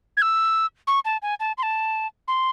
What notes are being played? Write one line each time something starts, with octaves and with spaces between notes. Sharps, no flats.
G#6
E6
C#6
A5
G#5
A5
C6
A5
C6